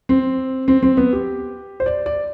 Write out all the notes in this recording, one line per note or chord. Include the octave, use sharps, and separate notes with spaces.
C4
C4
C4
B3
G4
C5
D5
D5